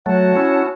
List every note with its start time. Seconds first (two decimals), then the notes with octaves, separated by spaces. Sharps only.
0.06 F#3 A3 F#4 C#5 F#5 A5
0.35 C#4 E4